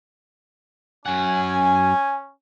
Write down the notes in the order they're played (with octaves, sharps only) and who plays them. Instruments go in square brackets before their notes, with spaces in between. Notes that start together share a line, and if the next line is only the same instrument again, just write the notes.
[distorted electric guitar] F#2 F#5 [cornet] C#4 [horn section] G#5